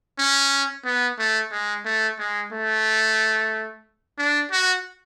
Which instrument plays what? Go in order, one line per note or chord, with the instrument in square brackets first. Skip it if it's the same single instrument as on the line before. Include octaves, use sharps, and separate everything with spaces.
[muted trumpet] C#4
B3
A3
G#3
A3
G#3
A3
D4
F#4